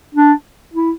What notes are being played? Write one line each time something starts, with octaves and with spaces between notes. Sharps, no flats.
D4
E4